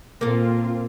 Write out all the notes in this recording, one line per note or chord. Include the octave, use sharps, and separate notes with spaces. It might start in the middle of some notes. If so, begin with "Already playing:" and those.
A#2 A#3 C4 F4 A4